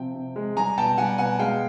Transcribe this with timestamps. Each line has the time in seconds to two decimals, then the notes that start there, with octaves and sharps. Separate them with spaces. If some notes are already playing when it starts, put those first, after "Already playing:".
Already playing: C3 F3 G5
0.14 C3
0.36 G#3
0.57 G3 G#5 A#5
0.77 B2 G5 A5
0.98 G3 F#5 G#5
1.18 B2 F#5 G#5
1.39 G#3 F5 G5